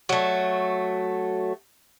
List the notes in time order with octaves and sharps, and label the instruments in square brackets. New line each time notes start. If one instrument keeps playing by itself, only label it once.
[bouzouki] F#3 A3